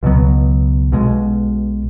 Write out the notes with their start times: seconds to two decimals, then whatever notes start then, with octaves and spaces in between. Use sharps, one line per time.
0.03 C#2 B2 F#3 B3
0.92 B1 B2 G#3